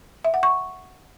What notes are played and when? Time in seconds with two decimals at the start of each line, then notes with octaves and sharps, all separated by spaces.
0.25 E5
0.34 F#5
0.43 C#6